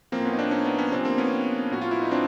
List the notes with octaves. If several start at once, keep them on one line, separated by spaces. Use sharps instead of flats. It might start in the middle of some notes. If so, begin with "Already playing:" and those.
A2 F3 A#3 C4
B3 C#4
D#4
C4 D4
C#4 D#4
B3
B3 C#4
C3 F3 C4 D4
A#3 C4
B3 C#4
A2 F3 F#4
F4
E4
D#4
C4 D4